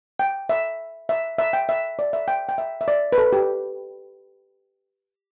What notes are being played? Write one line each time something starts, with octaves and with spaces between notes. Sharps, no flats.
G5
E5
E5
E5
G5
E5
D5
E5
G5
G5
E5
E5
D5
B4
A4
G4